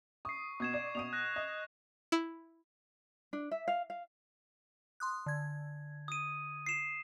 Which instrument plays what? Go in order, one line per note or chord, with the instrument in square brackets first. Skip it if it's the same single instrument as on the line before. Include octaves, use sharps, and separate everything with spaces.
[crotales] C#6 C7 [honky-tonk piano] D#6
[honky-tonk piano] B2 [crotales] C#6 G#6 E7
[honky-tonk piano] D5
[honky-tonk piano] B2 D#6 D#7 [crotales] F7
[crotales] F#6 A#6
[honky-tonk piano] D#5
[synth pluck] E4
[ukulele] D4
E5
F5
F5
[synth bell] C6 D#6 F#6
D3 G#6
[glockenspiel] D#6 D#7
C7 E7